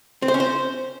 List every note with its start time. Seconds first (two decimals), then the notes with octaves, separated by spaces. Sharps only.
0.22 C4
0.28 C5
0.34 C#4
0.40 C5